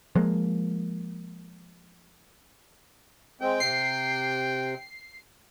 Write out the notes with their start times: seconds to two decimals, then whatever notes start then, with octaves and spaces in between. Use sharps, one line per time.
0.15 F3 G#3 A#3
3.41 G#3 C4 G5
3.60 C3 C7